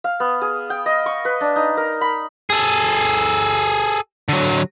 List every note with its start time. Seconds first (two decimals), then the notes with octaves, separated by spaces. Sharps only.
0.04 F5
0.20 B3
0.41 G#4
0.70 G5
0.86 D#5
1.06 C#6
1.25 B4
1.41 D4
1.56 D#4
1.77 A#4
2.01 B5
2.50 G#4 A4
4.29 D3 F#3